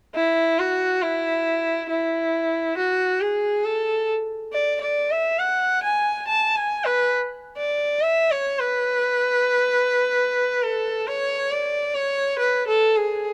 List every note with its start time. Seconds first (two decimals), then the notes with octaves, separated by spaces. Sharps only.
0.15 E4
0.59 F#4
1.02 E4
1.90 E4
2.77 F#4
3.21 G#4
3.65 A4
4.53 D5
4.81 D5
5.11 E5
5.39 F#5
5.83 G#5
6.27 A5
6.56 G#5
6.85 B4
7.57 D5
8.02 E5
8.31 C#5
8.59 B4
10.64 A4
11.07 C#5
11.51 D5
11.95 C#5
12.39 B4
12.67 A4
12.96 G#4